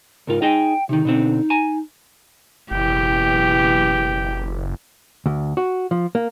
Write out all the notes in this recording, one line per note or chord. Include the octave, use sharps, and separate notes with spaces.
C#2 G#2 F4 A#4
D#4 G#4 D#5 G5
C3 D#3 D#4
B2 D3 C4
G#5 A#5
F#1 B2 E3 G4 G5
D2
F#4
F3
A#3